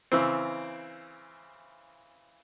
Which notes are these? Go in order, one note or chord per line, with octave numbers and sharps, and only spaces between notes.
C#3 E3 C4